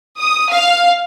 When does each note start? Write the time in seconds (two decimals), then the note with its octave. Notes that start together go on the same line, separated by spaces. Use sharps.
0.19 D#6
0.51 F5